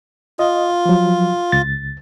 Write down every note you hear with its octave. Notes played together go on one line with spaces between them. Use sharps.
F4 D#5
F3 F#3
C#2 A6